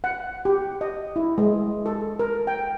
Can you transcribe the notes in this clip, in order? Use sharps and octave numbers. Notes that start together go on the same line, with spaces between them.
F#5
G4
D#5
E4
G#3
A4
A#4
G5